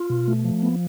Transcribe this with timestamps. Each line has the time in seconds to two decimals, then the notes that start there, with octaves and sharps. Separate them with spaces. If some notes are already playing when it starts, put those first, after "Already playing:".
Already playing: F4
0.10 B2
0.28 A3
0.44 F3
0.62 B3